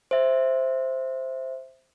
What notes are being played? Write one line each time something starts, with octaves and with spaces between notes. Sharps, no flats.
C5 E5